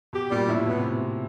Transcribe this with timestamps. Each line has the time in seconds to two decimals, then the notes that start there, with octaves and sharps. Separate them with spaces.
0.13 B2 G4
0.31 A#2 G3
0.48 A2 E4
0.66 B2 B3
0.78 C3